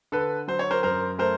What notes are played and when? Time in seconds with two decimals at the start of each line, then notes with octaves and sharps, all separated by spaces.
0.12 D3 A4 B4
0.48 F#3 C5
0.59 C#5
0.71 A#4 C5
0.83 F#2 A#4 C5
1.18 A3 A#4 C5